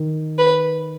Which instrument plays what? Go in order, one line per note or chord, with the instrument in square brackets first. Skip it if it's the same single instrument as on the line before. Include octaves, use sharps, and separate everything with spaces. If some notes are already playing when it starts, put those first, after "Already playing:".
Already playing: [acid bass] D#3
[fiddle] B4